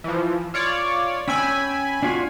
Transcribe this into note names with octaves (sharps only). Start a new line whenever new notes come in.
E3 F3
F4 C#5 D5
C#4 G5 G#5 B5 E6
D4 F4 F#4